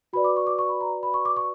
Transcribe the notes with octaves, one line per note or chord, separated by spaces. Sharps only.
F#4 B4 D5 B5
D6
C#6
D6
C#6
B5
A#5
B5
C#6
D6
C#6